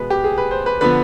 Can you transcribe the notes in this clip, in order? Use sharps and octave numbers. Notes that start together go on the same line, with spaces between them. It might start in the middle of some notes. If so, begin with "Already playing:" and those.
Already playing: B2 G#3 B3 B4
G4
G#4
B4
C5
B4
D3 F3 B3 B4